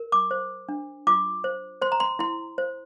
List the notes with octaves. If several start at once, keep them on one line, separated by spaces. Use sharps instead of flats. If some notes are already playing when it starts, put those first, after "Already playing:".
Already playing: A#4
D6
C5
D4
F4 D6
C5
C5 C6
A#5
C6
E4 C6
C5